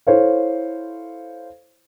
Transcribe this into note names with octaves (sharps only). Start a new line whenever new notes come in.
E4 A4 C5 C#5 F5